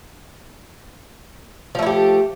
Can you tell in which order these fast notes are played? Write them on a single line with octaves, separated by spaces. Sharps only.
F3 A3 E4 G4